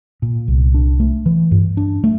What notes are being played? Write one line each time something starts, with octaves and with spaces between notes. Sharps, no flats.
A#2
C2
D4
A3
E3
G2
D4
A3